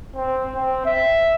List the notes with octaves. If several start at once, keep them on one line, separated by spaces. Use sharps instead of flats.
C4
C4
E5